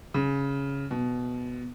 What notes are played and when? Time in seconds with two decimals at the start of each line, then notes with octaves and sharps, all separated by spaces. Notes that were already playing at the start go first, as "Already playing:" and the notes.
0.14 C#3
0.91 B2